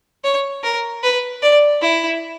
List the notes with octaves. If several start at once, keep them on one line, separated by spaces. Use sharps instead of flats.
C#5
A#4
B4
D5
E4